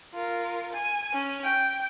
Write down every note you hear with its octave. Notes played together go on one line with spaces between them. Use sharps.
F4 A#4
G#5
C#4
G5